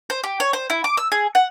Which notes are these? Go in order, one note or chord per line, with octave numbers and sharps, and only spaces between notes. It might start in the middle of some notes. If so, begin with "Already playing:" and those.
C5
G4
C#5
C5
E4
D6
E6
G#4
F#5